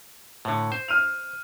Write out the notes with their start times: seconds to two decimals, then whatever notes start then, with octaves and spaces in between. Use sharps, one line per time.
0.45 A2 D3
0.72 C5
0.88 F6 D#7 F7